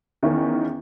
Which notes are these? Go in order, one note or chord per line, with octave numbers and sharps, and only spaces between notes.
E2 D#3 C#4